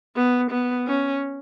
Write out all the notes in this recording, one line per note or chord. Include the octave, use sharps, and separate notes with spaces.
B3
B3
C#4